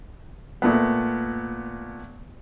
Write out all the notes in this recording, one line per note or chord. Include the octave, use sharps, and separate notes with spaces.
A#2 A3 B3